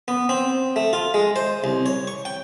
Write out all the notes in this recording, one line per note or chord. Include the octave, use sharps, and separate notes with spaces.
B3
C4
A3
F4
G#3
C5
C2
C#5
C#6
G5